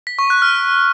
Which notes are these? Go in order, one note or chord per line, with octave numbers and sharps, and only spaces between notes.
B6
C#6
F#6
F6